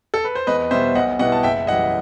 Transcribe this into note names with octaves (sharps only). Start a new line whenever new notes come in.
A4
B4
C5
E2 B4 D#5
B2 G3 C5 E5
B1 D#5 F#5
B2 G3 B3 E4 D#5 F#5
A5
F#1 E5 G5
F#2 E3 G3 D#5 F#5